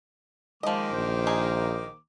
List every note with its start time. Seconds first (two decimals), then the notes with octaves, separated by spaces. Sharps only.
0.63 D#3 F3 G#3 A#3 D#5 D6
0.92 A#1 C5
1.27 D#4 G#4